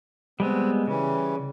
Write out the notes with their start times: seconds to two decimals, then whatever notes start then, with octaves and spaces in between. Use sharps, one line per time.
0.40 G3 G#3 B3 C4
0.87 C#3 E3 G3